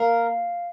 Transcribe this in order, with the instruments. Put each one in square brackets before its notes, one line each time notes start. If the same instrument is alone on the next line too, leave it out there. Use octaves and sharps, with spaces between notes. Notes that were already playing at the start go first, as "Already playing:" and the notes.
Already playing: [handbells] A#3 F5 [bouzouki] A#4